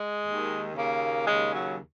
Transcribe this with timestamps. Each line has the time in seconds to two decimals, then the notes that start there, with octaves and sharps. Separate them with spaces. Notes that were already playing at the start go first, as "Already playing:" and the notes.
Already playing: G#3
0.25 D#2 D#3
0.75 D#2 C#3 A#3
1.26 D#2 C#3 G#3
1.53 F#3